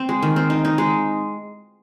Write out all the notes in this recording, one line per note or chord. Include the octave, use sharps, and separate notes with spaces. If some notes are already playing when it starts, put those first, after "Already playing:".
Already playing: C4
G#3
D#3
C4
D#4
D#4
G#3